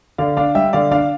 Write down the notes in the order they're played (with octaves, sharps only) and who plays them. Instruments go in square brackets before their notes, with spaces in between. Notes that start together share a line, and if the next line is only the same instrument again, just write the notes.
[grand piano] D3 D5 F5
D4 D5 F5
G3 E5 G5
D3 D5 F5
D4 D5 F5